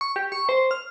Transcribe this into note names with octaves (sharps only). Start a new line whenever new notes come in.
C#6
G4
C#6
C5
F6